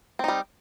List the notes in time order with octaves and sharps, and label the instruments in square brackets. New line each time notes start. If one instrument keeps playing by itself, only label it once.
[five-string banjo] C4
D#4
G3